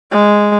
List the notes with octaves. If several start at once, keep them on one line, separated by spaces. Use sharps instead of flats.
G#3